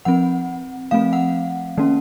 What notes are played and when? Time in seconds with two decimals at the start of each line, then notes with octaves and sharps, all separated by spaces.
0.05 F3 C4 F#5
0.91 F3 A3 C4 F5
1.13 F#5
1.78 D#3 A#3 C#4